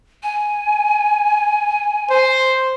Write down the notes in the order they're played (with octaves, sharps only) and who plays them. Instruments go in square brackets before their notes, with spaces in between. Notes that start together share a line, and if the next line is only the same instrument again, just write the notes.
[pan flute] G#5
[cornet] C5